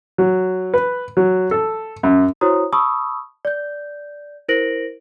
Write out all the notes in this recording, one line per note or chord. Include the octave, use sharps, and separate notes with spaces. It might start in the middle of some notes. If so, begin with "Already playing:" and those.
F#3
B4
F#3
A4
F#2
E4 F#4 C5 C#5 A#5 D#6
A5 B5 C#6 D#6 E6
D5 G6
E4 A#4 C5 A#6 D7 F#7